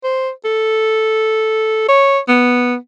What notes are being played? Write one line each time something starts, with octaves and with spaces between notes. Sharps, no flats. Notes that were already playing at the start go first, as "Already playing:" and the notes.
C5
A4
C#5
B3